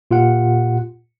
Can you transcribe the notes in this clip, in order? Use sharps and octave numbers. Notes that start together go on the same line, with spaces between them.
A#2 F4 G4 F#5